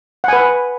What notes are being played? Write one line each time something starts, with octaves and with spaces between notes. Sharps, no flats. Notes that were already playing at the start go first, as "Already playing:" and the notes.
B4 F#5 G#5